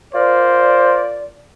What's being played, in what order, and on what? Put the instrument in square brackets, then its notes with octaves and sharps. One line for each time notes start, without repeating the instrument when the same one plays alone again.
[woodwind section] F4 A#4 D5 [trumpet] C5